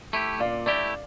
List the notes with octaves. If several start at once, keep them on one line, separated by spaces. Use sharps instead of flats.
A3 E4 G4
A#2 D5 F5
A3 E4 G4 D5